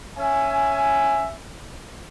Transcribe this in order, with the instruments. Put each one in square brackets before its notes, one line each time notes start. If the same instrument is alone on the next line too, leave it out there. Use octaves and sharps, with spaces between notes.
[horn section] C#4 E5 G#5